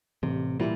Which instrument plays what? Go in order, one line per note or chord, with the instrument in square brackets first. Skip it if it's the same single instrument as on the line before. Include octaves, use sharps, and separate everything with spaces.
[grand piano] A1 [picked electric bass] C3
[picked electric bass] A#2 [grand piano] E3 G3